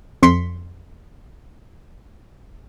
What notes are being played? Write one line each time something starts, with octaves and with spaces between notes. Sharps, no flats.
F2 C6 B6 C#7